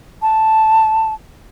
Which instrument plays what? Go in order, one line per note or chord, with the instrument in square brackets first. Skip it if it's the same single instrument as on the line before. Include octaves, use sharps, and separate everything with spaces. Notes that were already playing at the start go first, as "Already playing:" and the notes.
[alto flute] A5